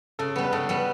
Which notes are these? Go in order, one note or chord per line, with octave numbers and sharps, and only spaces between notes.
C#3 A4
G3 B3
B4
C#3 A4
G3 B3